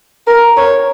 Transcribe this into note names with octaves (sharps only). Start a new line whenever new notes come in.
A#4
C#5